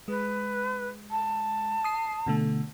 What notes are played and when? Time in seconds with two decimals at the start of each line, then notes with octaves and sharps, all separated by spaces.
0.08 G#3 B4
1.11 A5
1.84 D#6 C7
2.27 B2 D3 A3